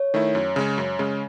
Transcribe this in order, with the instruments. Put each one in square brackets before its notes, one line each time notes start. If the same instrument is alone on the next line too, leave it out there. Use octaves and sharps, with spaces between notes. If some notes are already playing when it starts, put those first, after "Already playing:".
Already playing: [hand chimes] C#5
[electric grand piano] D#3 A3 E4
F#2
C#3 G#3 C#4
F#2
C#3 G#3 C#4